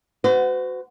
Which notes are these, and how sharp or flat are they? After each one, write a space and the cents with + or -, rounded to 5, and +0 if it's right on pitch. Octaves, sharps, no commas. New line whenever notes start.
F#4 +0 C5 -45